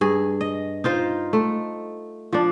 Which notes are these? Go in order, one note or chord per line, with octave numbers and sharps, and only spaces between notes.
G2 G#4
D#5
D#4 F4 C5
A3
F3 D4